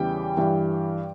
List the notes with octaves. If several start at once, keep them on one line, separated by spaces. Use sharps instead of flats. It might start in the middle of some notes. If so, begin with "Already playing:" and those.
Already playing: E2 C#3 E3 G3 G5
G2 E3 G3